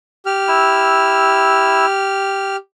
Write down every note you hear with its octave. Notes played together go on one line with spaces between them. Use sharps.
G4 F6
E4 E6